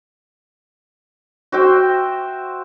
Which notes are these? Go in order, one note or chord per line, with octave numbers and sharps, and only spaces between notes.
F#4 C5 E5 G5